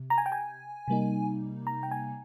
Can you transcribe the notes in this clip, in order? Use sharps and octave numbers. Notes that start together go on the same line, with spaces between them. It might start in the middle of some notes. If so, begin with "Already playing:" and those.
Already playing: C3
A#5
G#5
G5
G#5
C3 G3 A#3 D#4
A#5
G5
G#5